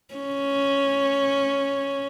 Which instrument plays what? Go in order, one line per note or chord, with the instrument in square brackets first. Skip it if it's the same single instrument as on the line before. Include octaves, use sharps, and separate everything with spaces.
[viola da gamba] C#4